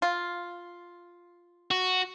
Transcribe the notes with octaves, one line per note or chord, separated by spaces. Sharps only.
F4
F#4